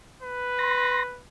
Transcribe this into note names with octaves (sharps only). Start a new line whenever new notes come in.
B4
C6 A#6